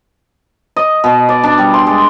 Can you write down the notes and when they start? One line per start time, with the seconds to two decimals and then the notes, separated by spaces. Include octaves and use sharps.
0.76 D#5
1.04 B2
1.29 D5
1.44 D4
1.58 G3
1.74 C6
1.86 G#3